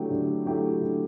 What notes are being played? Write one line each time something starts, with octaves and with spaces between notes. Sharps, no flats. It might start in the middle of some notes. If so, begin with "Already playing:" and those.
Already playing: D3 F#3 A3 E4 G4
D3
F#3 A3 E4 G4
D3